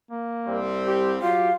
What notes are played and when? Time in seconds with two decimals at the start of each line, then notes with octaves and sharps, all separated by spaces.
0.11 A#3
0.46 C2 G3 C4
0.86 G4
1.22 F#3 F4 G4 F5